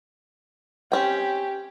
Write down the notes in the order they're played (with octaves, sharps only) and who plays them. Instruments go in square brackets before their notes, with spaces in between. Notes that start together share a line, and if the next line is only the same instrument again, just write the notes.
[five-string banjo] C4 C#4 G5 [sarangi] G4